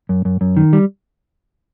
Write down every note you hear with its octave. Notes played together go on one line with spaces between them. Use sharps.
F#2
F#2
F#2
D#3
G3